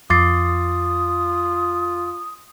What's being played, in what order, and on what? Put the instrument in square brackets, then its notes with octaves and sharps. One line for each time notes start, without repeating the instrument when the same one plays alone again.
[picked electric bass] F2 [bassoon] F4 [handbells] D6 A6 C7 [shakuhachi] D#6